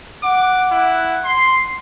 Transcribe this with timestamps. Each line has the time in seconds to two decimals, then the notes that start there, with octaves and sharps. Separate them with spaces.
0.23 F#5 D6
0.72 E4
1.24 C6 C7